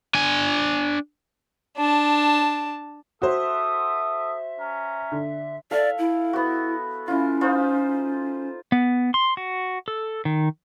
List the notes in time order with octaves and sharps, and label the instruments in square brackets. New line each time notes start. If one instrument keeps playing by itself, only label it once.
[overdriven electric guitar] D4 G#5
[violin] D4 A5
[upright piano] F#4 C5 [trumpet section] A4 D#6 [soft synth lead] E5
[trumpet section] C#4 A#5
[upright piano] D3
[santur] A4 E5 F5 [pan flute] D5
[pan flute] E4
[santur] B3 F#4
[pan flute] C#4 [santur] E4 F4
[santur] D#4 F4 C5
[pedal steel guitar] B3
C6
F#4
A4
D#3